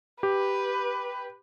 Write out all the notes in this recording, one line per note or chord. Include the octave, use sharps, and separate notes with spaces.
G4 B4